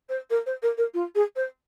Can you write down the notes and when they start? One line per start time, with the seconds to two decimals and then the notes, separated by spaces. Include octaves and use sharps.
0.09 C5
0.30 A#4
0.46 C5
0.62 A#4
0.77 A#4
0.94 F4
1.15 G#4
1.36 C5